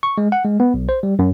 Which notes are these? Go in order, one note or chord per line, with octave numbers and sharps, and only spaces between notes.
C#6
G#3
F#5
G#3
B3
B1
C5
G3
F#2